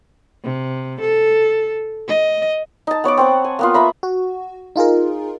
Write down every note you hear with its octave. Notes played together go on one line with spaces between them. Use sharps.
C3
A4
D#5
D#4 A5
B3 C#5 F#5 D6
C4 C#5 F#5
G#5
A#3 B3 F4
B4 E5 A#5 B5
F#4
D#4 F4 G#4 A#4